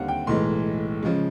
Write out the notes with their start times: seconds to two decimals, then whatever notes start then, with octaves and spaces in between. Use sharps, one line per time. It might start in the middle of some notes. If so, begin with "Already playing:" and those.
Already playing: D#2 D3 G3 C4 F5 F#5
0.08 G5
0.27 B1 A2 E3 G#3 C6
1.03 C#3 F3 G#3